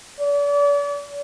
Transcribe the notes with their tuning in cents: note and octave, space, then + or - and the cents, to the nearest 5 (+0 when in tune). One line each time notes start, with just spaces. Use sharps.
D5 -40